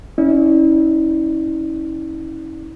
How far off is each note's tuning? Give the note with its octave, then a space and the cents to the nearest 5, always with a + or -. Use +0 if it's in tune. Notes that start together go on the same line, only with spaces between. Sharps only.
C#4 +0 E4 -35 D5 +15